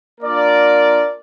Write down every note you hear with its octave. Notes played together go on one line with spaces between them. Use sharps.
A#3 D4 F4 A#4 D5